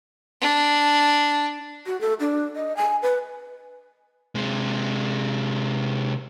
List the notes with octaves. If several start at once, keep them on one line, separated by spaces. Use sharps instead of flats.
D4
F#4
A4
D4
D#5
G#5
B4
C3 G#3